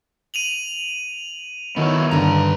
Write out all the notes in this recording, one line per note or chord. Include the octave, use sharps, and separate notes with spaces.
D#7 F7 F#7
D#3 B3 E4 F#4 C#5 F6
G2 D3 B4 A#5